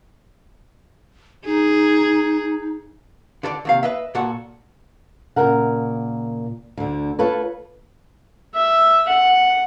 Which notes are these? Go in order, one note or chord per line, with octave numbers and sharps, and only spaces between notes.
D#4 G#4
D3 A4 B4 D5
D#2 C3 F5
B4 D#5 E5
A#2 F#4 A4 F#5
A#2 C#3 A#4 F#5
D2 D3
F4 A4 B4 C#5
E5
F#5